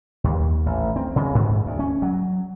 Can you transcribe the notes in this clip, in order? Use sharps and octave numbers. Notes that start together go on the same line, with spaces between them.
D#2
A1
C4
C#3
G#2
D2
C#4
F#3